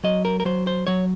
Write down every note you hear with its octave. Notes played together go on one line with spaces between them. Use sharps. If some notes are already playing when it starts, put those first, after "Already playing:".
F#3 D#5
A#4
A#4
F#3 C5
C5
F#3 C#5